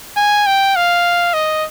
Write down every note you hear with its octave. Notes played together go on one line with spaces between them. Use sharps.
G#5
G5
F5
D#5